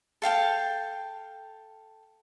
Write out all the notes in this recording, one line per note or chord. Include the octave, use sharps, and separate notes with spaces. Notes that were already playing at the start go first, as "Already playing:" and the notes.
A4 F5 G5 A5